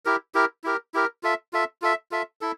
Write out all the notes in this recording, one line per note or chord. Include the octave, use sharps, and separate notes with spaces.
E4 G4 A#4
E4 G4 A#4
E4 G4 A#4
E4 G4 A#4
F4 A4 E5
F4 A4 E5
F4 A4 E5
F4 A4 E5
E4 A4